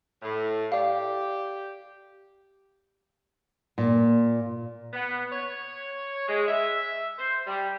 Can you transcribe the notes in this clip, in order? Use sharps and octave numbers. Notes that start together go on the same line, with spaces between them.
A2
G4 D5 F5
A#2
B3
C#5
G#3
E5
C5
G3